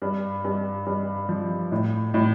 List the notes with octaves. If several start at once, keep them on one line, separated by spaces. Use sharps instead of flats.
G2
G2
G2
F3
A2
A2